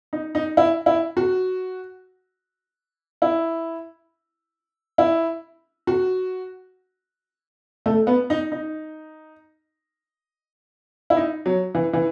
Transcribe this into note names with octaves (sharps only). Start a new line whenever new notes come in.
D#4
D#4
E4
E4
F#4
E4
E4
F#4
A3
B3
D#4
D#4
E4
D#4
F#3
E3
E3